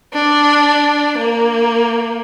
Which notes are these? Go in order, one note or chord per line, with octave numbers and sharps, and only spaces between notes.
D4
A#3